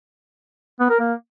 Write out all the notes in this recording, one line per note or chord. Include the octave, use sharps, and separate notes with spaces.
B3
A#4
A#3